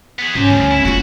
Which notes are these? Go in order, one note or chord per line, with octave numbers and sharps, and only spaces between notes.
B3 G#4
G#2 C#4 G4 C5
D2 G2 F3
E4
A#3 F4 F#4